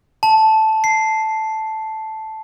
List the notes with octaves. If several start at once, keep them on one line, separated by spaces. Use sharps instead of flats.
A5
C7